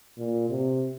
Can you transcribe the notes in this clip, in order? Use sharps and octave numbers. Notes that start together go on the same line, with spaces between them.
A#2
C3